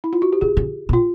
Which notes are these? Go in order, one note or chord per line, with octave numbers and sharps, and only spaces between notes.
E4
F4
F#4
G4
C#3 G#4
C#3
B2
F4